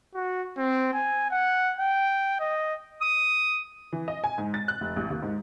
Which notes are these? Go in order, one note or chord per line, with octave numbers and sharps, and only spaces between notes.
F#4
C4
G#5
F#5
G5
D#5
D#6
E3
D#5
G#5
G#2
A6
F#6
F1
A1
D#2
G#2